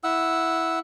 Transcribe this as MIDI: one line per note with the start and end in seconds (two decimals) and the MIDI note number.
0.04 0.79 64
0.04 0.79 78
0.04 0.79 88